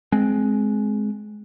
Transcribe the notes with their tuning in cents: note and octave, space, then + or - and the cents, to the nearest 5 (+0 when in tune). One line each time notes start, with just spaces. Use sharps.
G#3 +20 C4 +0